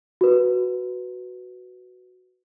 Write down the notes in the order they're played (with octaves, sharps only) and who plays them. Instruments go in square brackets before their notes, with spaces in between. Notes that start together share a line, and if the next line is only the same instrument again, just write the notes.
[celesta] F#4 B4